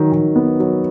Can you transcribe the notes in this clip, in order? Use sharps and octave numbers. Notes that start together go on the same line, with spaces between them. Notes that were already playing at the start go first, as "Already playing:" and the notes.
Already playing: D#3 F#3
D#3
B3
F#3